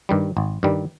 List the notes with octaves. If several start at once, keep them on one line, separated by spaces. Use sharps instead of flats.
G2 D#3 G3
G#1
G2 D#3 G3